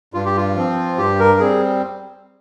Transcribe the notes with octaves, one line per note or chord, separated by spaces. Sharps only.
G2 F4
G4
F4
F3 C4
G2 G4
A#4
G3 C4 G#4